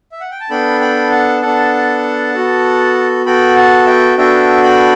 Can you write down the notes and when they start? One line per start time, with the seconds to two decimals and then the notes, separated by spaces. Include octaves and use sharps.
0.12 E5
0.21 F#5
0.31 G5
0.40 A5
0.50 B3 D4 A4 G5 B5
0.80 G5 B5
1.11 F#5 A5
1.42 B3 D4 A4 F#5 A5
2.34 B3 F#4 A4
3.26 B3 F#4 A4 G5 B5
3.56 F#5 A5
3.86 E5 G5
4.17 B3 D4 F#4 A4 E5 G5
4.63 G5 B5